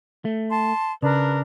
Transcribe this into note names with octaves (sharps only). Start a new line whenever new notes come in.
A3
A5 C6
C#3 D4 A#4 B4